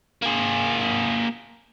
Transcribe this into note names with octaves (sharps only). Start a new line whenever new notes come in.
A#3 G#4